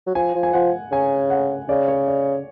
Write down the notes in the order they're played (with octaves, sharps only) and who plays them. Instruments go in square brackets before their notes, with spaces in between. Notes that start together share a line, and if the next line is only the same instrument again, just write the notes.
[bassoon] F#3
[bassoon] F3 [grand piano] G#5
[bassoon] F3
[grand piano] G#5
[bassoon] F3 [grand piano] F#5
[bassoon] C#3 [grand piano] G#5
[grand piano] F#5
[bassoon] C#3 [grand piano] D5
[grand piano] C#5
D5